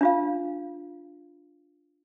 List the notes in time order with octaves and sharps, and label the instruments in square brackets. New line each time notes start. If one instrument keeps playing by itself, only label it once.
[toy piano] D4 F4 F5